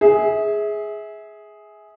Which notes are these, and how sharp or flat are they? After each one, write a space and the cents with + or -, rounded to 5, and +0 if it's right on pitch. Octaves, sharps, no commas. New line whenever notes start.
G#4 +5 E5 -25